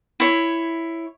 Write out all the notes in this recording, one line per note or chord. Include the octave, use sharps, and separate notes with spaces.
E4 C#5